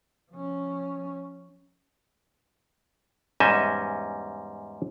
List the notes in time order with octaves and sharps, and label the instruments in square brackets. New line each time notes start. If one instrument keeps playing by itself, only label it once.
[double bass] F3 C#4
[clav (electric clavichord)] E2 G#2 G3 C#4 D#5 E5